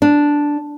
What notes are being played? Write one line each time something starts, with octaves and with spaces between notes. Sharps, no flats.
D4